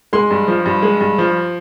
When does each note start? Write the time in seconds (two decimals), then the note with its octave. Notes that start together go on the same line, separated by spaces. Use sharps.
0.13 G#3 C6
0.30 G2
0.48 F3
0.66 G2
0.83 G#3
1.01 G2
1.18 F3